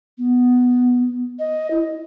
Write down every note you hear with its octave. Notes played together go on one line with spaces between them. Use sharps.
B3
D#5
E4